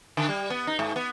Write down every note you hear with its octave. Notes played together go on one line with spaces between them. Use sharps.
D3
G3
B3
D#4
G#2
B3